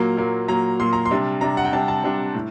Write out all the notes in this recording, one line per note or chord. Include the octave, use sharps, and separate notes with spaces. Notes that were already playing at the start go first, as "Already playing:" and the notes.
Already playing: A#2 F#3 A#3 A#5
A#2 F#3 A#3
A#2 F#3 A#3 A#5
A#2 F#3 A#3 C6
A#5
C6
C3 G3 D4
C3 G3 D4 A#5
F#5
G5
C3 G3 D4 A5
A5
C3 G3 D4
A2